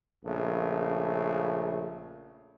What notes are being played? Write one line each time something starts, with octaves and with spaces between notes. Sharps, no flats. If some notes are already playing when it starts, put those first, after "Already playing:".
A#1 C#3 A3